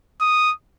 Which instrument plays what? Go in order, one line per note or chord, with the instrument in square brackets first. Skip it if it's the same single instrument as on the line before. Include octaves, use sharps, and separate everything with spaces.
[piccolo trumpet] D#6